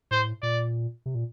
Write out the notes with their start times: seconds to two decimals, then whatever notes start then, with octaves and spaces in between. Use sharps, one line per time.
0.11 A2 C5
0.42 A#2 D5
1.06 C3
1.15 A#2